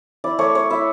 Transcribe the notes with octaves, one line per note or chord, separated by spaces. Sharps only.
E4 D5
A3 C#5
A3 C#5
E4 E5